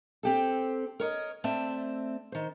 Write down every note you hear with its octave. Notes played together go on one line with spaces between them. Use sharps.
C4 G4 A4
A#4 C#5 D#5
A3 C4 D5 E5
D#3 C5